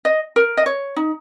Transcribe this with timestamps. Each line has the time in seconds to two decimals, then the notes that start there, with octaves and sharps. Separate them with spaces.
0.05 D#5
0.36 A#4
0.57 D#5
0.66 C#5
0.96 D#4